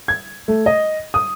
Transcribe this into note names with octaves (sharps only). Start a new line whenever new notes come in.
G#6
A3
D#5
D#6